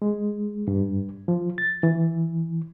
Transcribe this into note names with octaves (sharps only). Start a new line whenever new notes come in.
G#3
G2
F3
A6
E3